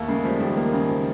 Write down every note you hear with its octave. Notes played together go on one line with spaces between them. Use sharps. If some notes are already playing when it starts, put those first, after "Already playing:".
Already playing: D#2 A3 A#3
C#3 G#3
F3 G3
D#2 D#3
A#3
C#3
F3